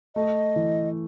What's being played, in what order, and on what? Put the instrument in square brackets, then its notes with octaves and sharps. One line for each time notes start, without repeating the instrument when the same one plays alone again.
[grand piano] A3 [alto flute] D#5
[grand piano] E3